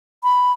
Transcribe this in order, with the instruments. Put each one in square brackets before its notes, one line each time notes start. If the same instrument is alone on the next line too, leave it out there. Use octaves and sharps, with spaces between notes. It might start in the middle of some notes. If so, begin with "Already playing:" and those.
[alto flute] B5